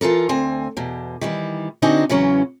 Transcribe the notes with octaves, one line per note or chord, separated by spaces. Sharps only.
E3 F4 A4 A#4
D2 C4 G#5
E2 B2
D#3 E3 G3
D3 C4 D4 D#4 F#4 G#5
E2 C#3 E3 F#3 C#4